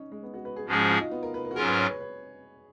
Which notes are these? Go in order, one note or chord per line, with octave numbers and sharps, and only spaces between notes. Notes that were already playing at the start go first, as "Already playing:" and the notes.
Already playing: C#4 D#4
G#3
B3
F#4
B4
G#4
G#2 F3 G#3 C#4 F#4 G#4
F4
F4
D#4
B3
A#4
B4
A#4
F#4
G#2 F#3 C#4 F4 G#4 A#4
B4
C#5
B4
B4